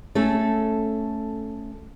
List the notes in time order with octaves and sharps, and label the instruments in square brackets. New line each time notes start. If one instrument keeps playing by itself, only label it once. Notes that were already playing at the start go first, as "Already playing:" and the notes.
[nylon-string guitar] A3 C#4 A4